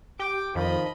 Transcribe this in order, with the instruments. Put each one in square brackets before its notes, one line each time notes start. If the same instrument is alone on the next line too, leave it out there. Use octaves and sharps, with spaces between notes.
[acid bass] G4 [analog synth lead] G5 [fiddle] D6
[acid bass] F2 [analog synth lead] D#3 [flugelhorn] F3 [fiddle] D#5 B5